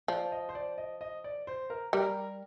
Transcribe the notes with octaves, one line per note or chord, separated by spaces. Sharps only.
F3 D5
D#5
C5
D5
D#5
D#5
D5
C5
A#4
G3 A#4